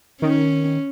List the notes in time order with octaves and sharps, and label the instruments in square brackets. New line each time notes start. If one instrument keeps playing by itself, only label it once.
[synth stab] D#3 [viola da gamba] C#4